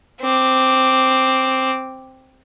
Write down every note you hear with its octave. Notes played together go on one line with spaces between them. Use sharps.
C4 D6